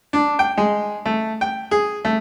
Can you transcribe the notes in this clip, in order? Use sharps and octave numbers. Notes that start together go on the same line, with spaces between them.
D4
G5
G#3
A3
G5
G#4
A3